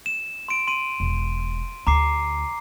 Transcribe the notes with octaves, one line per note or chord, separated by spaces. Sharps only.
E7
C6 D7
C6 D#7
E1
D2 A#5 D6 C7